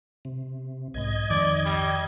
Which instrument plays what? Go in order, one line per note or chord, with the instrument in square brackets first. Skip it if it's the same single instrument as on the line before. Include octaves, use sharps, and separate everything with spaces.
[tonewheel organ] C3
[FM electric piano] B1 G#2 [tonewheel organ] D#5 G#6
[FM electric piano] F2 D#3 [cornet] D5
[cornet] G3